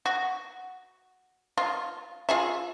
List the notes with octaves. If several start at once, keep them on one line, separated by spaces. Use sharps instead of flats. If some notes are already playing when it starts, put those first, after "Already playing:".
F#4
F4
F4 G#4 E5